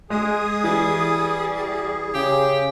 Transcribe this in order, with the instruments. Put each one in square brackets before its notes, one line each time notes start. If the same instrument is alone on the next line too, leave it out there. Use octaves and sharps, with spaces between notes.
[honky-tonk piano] G#3 [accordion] G#4 G#5 D#6
[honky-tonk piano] E3 [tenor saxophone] G3
[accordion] G#4
[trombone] C#3 [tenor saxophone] G4